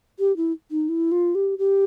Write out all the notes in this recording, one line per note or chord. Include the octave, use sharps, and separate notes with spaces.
G4
E4
D#4
E4
F4
G4
G4